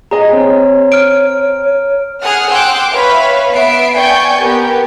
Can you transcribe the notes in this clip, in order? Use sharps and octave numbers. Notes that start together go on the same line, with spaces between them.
G#4 D#5 A#5
C4 C#5
F6 D7
G#4 F#5 D#6 F6
F#5 G5 C6 D6 E6 F#6
B4 C#5 E5 F5 B5
B3 E5 C7 D7
D5 G5 G#5 C#6 G6
B3 G4 A#4